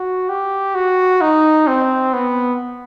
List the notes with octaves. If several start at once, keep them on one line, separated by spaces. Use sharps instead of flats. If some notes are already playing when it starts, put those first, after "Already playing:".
Already playing: F#4
G4
F#4
D#4
C4
B3